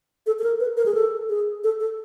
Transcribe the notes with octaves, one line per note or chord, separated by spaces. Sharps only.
A4
A4
A#4
B4
A#4
G#4
A4
G#4
A4
A4